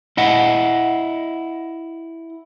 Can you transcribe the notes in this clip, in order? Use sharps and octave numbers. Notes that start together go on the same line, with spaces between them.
E4 D#5 F#5